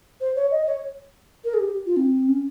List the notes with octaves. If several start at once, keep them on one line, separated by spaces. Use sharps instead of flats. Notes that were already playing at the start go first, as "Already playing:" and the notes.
C5
C#5
D#5
C#5
A#4
G#4
G4
F4
C4
C#4